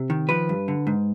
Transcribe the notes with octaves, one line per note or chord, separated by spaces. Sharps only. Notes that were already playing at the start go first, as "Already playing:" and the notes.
Already playing: C3
D#3
F3 B4
G2
D3
G#2